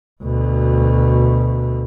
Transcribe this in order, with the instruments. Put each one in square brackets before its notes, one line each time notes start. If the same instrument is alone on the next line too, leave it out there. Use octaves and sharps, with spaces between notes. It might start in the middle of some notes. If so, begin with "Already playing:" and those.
[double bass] D2 B2